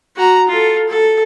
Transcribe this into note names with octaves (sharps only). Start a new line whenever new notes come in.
F#4 A#5
F4 A4
A4